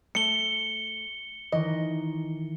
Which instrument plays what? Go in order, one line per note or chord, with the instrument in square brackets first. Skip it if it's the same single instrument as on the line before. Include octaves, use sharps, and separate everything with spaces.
[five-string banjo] A3 [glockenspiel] C#7 G7
[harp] D#3 E3 [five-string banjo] D#5